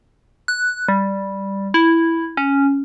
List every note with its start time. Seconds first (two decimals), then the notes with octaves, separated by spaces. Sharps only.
0.48 F#6
0.88 G3
1.74 E4
2.37 C#4